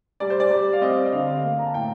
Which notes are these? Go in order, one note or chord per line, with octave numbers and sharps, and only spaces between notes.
G3 D5
C5
D5
G3
F5
C4 D#5
D5
D#5
D3 F5
A#3 F5
A#5
A5
A2 G5